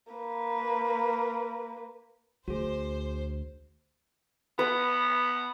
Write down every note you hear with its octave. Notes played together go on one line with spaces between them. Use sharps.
A#3 B4
D2 F#4 G#4 C5
B3 B4